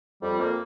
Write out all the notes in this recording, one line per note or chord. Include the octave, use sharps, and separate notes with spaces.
F2 G3
F2 A#3